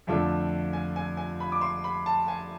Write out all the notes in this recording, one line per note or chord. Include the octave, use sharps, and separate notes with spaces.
F2 D3 A3 D4 F4 E5
G#5
G#5
G#5
B5
D6
C6
B5
A5
G#5